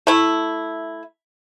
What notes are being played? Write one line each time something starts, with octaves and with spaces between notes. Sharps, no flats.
A3 E4